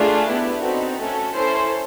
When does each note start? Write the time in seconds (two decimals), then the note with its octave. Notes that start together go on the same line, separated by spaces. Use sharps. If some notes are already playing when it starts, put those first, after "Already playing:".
Already playing: A3 D4 F4 G#4
0.28 B3 E4 G4
0.63 C4 D#4 F#4 A4 B4
0.99 A3 C#4 F#4 A4
1.34 C#4 E4 A4 C5